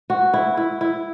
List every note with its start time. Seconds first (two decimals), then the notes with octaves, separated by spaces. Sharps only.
0.10 F#4
0.34 E4
0.57 E4
0.81 E4